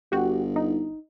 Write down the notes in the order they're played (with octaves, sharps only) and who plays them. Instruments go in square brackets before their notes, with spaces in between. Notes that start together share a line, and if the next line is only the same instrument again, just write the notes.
[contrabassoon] G1 [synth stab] F#4 G4
[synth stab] D#4